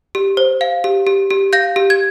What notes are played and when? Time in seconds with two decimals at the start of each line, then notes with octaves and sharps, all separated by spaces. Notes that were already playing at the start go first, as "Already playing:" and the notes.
0.15 G4
0.37 C5
0.61 F5
0.84 G4
1.07 G4
1.30 G4
1.53 F5 G6 A#6
1.76 G4
1.90 G#6